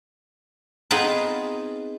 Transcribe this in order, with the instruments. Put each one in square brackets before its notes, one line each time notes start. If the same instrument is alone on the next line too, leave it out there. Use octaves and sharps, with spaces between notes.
[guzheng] B3 C4 D#4 F4 G#4 B4